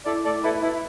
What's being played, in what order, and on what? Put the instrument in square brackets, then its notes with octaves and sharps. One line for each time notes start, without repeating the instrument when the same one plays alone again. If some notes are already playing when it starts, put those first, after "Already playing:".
[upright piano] E4 [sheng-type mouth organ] A4 D5
[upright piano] A2 [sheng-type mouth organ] A4 D5
[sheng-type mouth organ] E4 A4 [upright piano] B4
[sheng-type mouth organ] E4 [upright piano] B4